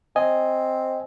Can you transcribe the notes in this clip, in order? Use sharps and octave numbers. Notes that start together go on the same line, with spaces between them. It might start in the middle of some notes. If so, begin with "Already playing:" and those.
C4 D#5 G#5